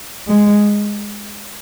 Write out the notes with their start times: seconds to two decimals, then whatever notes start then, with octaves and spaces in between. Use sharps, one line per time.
0.28 G#3